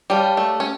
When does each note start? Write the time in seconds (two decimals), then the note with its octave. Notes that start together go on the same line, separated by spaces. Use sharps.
0.10 G3 G4 C#5 F5 A5
0.37 A3
0.60 C#4